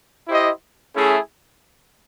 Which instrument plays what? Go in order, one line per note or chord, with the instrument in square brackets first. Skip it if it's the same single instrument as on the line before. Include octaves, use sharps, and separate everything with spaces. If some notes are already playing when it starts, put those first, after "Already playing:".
[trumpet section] E4 G4 C5 D#5
A3 C#4 E4 G#4